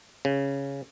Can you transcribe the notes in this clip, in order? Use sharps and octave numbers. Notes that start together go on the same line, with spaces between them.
C#3